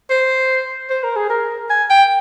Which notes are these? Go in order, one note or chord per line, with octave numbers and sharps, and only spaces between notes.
C5
C5
A#4
G#4
A#4
G#5
G5